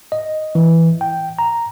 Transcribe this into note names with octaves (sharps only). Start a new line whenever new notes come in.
D#5
E3
G5
A#5